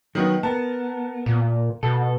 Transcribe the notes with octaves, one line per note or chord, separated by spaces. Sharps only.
D#3 F#3 B3 D#4
B3 A#4 A5
A#2
B2 A4